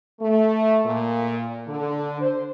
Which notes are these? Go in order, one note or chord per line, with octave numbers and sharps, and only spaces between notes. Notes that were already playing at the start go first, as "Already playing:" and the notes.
A3
A#2
D3
C5